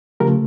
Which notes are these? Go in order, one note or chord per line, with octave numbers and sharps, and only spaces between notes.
C#3 F3 A3 G4 A#4